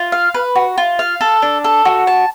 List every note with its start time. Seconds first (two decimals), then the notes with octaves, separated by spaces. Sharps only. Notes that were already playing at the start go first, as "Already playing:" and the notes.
Already playing: F4
0.12 F5
0.34 B4
0.55 F#4
0.78 F4
0.99 F5
1.21 A4
1.42 D4
1.64 A4
1.85 F#4
2.07 A5